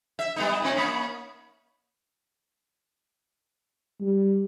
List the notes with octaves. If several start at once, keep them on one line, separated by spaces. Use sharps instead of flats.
E5
G3 B3 D#4
A#2 C4
A#3 C#4
G3